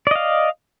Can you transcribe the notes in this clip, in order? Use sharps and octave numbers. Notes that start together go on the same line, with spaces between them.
D5 D#5 F5